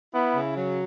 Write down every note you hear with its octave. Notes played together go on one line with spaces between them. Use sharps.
B3 E4
C#3
F#3